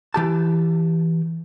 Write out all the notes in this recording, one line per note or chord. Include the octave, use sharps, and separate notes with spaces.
E3 G4 A5